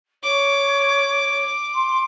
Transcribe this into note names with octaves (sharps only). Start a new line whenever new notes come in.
C#5 D6
C6